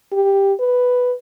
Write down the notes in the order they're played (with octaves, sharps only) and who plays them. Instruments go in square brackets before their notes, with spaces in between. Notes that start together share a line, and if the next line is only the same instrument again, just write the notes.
[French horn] G4
B4